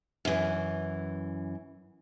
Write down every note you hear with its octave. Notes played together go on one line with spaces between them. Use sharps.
F#2 E3